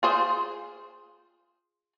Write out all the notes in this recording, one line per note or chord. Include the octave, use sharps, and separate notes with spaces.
F4 G#4 C5